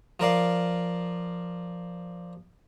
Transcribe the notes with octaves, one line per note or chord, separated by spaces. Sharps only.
F3 A#4 D5 F5